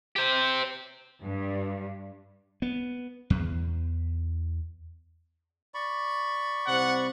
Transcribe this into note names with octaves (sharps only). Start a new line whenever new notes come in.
G4 C5
G2
B3
E2
D5 B5 C#6
C2 C3 C5 F#5